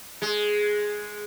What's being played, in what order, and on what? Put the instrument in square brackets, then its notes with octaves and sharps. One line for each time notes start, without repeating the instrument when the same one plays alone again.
[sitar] G#3